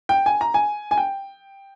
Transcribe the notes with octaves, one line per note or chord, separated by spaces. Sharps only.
G5
G#5
A#5
G#5
G#5
G5